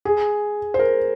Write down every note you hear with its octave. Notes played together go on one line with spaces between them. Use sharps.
G#4
C5
A#4